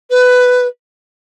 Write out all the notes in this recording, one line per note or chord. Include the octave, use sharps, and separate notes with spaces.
B4